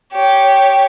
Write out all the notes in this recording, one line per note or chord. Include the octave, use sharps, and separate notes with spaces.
G4 C#5